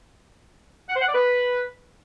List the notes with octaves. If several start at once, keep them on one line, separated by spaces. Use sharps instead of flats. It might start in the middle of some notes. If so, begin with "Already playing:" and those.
F#5
C5
F#5
D5
B4